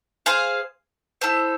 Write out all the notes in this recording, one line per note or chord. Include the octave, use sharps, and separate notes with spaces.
G#4 C5 F5
E4 A4 C5